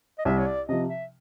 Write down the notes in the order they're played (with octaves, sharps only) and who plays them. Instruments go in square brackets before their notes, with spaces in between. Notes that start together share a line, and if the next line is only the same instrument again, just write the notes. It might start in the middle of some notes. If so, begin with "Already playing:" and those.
[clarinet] D#5
[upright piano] C2 [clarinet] E5
[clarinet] C#5
D5
[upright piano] C3 F3 [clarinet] D#5
[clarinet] E5